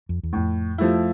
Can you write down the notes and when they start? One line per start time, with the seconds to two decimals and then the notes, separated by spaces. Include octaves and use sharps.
0.09 F2
0.23 E2
0.33 F2 A2
0.78 F3 A3 E4